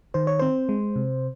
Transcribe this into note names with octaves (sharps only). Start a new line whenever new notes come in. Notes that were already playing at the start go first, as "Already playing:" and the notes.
D#3 C5
C#5
C4 C5
G#3
C3